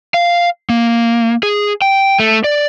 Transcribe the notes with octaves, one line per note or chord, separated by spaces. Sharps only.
F5
A#3
G#4
G5
A3
D5